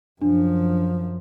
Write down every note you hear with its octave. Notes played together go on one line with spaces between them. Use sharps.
F#2 F3 D4